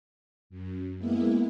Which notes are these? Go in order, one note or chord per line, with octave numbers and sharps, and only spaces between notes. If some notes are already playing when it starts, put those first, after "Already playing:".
F#2
G#3 A#3 B3 E4